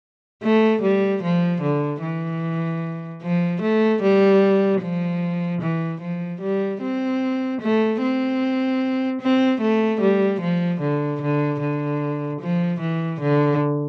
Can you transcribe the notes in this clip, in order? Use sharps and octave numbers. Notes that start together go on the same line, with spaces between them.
A3
G3
F3
D3
E3
F3
A3
G3
F3
E3
F3
G3
C4
A3
C4
C4
A3
G3
F3
D3
D3
D3
F3
E3
D3